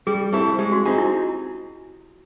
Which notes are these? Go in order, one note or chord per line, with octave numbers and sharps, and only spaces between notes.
G3 G#4
C4 E4 G4 A4
G#3 G4
F#4
C4 D#4 F4 G#4
E4